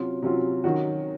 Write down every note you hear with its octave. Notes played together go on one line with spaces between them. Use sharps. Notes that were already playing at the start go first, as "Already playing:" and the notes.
Already playing: C3 F#3 C#4 F4
C3 F#3 C#4 F4
D#3 F#3 C#4 F#4